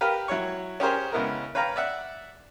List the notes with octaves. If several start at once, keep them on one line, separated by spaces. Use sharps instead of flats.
G4 A#4 B4 F5
F#3 E4 C#5 C#6
C#4 G4 G#4 A#4 C5 C#5
C#3 G#3 B3 E4 A#4
B4 C#5 F5 G5 A#5
D5 E5 F#5